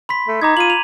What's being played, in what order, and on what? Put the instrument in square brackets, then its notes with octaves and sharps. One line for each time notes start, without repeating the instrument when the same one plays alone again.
[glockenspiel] B5 C6 B6
[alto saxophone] A3
[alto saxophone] D#4 [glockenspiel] A#5 D6 G#6
[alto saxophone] F4 [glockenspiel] D#7 F#7
[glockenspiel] F7